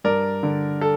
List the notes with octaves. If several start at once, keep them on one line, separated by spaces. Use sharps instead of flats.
G2 A#4 D5
D3
A4